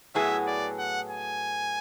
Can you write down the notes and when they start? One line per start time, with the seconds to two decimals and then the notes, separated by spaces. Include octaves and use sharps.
0.15 A2 F#3 B3 E4 G#4 E5
0.47 D5
0.78 F#5
1.10 G#5